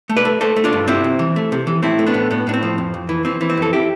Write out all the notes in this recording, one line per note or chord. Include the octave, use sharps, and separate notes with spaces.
A3
B4 D5
A3
A3 A4 C5
A3
D4 F4
G2
C3 C4 E4
C2
E3
A3
C3
E3
A2 C4 E4
A3
B3 D4
A2
A2 B3
A2 D4
C4
F3
F2
F2
E3
E3 C4
E3
C4
F2 A4
E4 G4